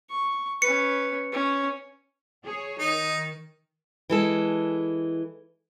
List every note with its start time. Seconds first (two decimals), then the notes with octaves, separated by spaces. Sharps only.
0.10 C#6
0.62 C#4 B4 C#7
1.32 C#4
2.44 G#4 C#5
2.79 D#3 D#4
4.10 E3 G#3 A4